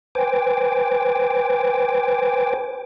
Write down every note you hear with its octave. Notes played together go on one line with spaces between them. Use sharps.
B4 C5 G5 G#5 D6